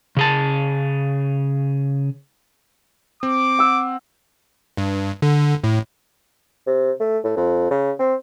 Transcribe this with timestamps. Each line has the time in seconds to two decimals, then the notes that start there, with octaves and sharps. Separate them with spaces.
0.17 C#3 G#4 A5
3.23 C4 D6
3.59 F#5 E6
4.77 G2
5.22 D3
5.64 A2
6.67 C3
7.00 A3
7.24 A2
7.37 F2
7.71 C#3
7.99 C4